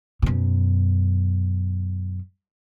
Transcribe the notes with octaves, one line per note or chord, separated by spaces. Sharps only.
F#2 B2